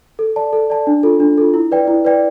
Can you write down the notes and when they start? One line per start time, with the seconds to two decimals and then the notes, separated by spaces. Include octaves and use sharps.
0.19 A4
0.36 D5 A5
0.53 A4
0.70 D5 A5
0.87 D4
1.03 F4 A4
1.20 D4
1.38 F4 A4
1.54 E4
1.71 B4 D5 G5
1.88 E4
2.05 B4 D5 G5